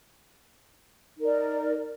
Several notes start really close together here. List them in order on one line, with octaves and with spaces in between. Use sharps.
D#4 A#4 D5